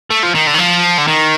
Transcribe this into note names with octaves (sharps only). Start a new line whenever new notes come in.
A3
F3
D#3
D3
D#3
F3
D3
D#3